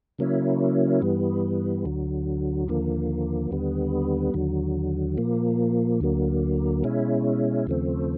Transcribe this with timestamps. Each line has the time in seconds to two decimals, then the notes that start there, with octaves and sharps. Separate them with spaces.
0.19 C#3 F#3 A#3 C#4 E4
1.02 G2 E3 G3 B3
1.85 D2 D3 F#3
2.68 D#2 D3 F3 A#3
3.51 D#2 D3 G3 B3
4.34 D#2 D3 F#3
5.17 A#2 F3 A#3
6.00 D2 D3 F#3 A#3
6.83 B2 G#3 C#4 E4
7.67 D#2 C#3 F3 A3 C4